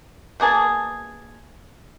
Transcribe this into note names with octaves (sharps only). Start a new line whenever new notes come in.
B2 A#3 G#4 A5